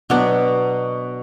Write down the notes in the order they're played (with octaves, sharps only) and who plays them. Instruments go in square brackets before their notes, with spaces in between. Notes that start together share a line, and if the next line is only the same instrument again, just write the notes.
[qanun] B2 F#3 B3 D4